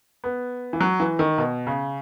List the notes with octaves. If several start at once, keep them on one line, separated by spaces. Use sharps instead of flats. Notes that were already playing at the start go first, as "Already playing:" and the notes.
B3
E3
F#3
E3
D#3
B2
C#3